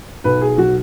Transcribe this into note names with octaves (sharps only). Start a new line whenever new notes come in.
B1 B4
G#4
F#3 F#4